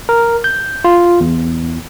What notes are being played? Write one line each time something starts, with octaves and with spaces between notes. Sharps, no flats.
A#4
G6
F4
E2